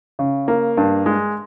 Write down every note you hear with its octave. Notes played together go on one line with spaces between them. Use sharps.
C#3
A#3
G2
G#3